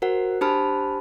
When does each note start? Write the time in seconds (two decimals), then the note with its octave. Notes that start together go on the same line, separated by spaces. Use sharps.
0.02 F#4 A#4 C5 F#5
0.41 D4 G4 C5 A5 B5 F6